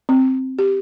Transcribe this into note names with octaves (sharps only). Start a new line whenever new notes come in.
C4
G4